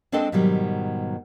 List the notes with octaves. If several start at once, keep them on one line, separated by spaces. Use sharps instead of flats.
G#3 C4 D4 A4 D#5 G5
G#2 B2 D#3 F#3 G3